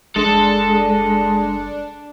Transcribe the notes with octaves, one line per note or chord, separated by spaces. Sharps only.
F#1 G#3 D4 A4